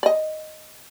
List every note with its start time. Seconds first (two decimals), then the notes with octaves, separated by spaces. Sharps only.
0.03 D5 D#5